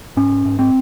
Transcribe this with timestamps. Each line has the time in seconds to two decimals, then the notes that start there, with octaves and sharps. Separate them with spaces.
0.17 G#2 C#4
0.46 G#2
0.59 C4